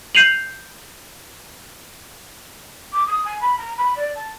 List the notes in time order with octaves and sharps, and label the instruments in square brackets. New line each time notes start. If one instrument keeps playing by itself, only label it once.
[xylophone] G6 C7 D#7 F7 F#7
[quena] D6
D#6
G#5
B5
A#5
B5
D5
A5